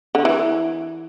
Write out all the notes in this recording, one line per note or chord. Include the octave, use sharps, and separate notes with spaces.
D3
E3